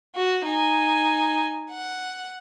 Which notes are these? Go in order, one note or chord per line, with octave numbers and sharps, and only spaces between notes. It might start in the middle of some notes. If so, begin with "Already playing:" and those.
F#4
D#4 G#5
F#5